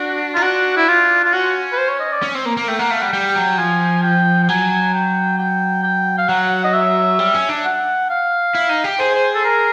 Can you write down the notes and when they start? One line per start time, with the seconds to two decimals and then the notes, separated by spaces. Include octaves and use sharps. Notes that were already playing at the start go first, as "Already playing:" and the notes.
Already playing: D4 F#4
0.34 D#4 F4
0.42 D4 F#4
0.77 E4
0.88 F4
1.24 F4
1.33 C#4 F#4
1.72 B4
1.78 C5
1.89 C#5
2.00 D#5
2.12 D5
2.22 C#4
2.35 C4
2.46 A#3
2.57 A#3
2.68 A3 G5
2.79 A#3 F#5
2.90 A3 F5
3.01 G3 F#5
3.13 G3 G5
3.35 F#3
3.58 F3 G#5
4.03 G5
4.43 G5
4.49 F#3 G#5
4.94 G5
5.39 G5
5.83 G5
6.18 F5
6.28 F#3 F#5
6.64 D#5
6.74 E5
7.19 G3
7.34 C#4
7.49 D4
7.65 F#5
8.10 F5
8.55 E4
8.69 D#4
8.84 G4
8.99 G#4 C5
9.15 C5
9.35 A4
9.45 A#4